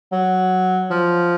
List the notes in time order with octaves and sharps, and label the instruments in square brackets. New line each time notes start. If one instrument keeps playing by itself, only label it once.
[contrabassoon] F#3
F3